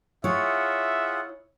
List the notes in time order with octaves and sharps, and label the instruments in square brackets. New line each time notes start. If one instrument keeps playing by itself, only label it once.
[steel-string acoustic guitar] E4 C#5 [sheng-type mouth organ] F4 G#4 F#5 [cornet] E5